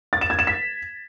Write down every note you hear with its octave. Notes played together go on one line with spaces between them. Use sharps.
A6
E7
G#6
E7
B6